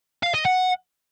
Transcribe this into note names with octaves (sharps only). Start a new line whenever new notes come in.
F5
D#5
F#5